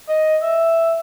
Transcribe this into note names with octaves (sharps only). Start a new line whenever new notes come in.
D#5
E5